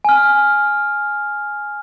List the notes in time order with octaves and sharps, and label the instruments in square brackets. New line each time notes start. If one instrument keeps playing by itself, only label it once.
[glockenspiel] G#5 F6